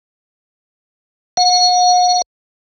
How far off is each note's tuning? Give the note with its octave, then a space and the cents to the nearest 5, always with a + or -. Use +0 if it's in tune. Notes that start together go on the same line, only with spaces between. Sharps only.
F#5 -40